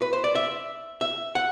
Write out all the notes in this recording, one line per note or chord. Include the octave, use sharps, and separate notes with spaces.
B4
C5
D5
E5
E5
F#5